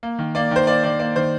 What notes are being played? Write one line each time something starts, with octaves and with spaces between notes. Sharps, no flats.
A#3
D#3
A#3 D5
D#3 C5
A#3 D5
D#3 D5
A#3 D5
D#3 C5